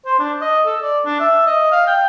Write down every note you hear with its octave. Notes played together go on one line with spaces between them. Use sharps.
C5
D4
D#5
A4
D5
D4
E5
D#5
F5
G5